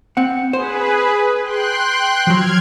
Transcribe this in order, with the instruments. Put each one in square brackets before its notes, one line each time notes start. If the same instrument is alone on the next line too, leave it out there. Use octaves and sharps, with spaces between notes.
[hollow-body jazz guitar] C4 F#5
[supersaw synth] G#4 B4 [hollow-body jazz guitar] C5
[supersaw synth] G5 C6 F#6
[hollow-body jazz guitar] F3 F#3 [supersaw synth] F6 G#6